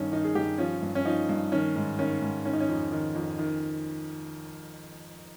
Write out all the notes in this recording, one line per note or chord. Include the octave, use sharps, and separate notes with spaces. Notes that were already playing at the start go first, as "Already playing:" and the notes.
Already playing: G2 D#3 C#4 D#4
D#3 D#4
G#4
G2 G4
F3 C#4
G2
C#4
F3 D#4
G2
D#3 C#4
G#2
D#3 C#4
G#2
D#3 C#4
D#4
C#4
F2
D#3
F2
D#3